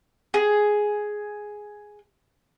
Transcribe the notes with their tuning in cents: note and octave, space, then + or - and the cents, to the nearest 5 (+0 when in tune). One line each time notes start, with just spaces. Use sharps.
G#4 +5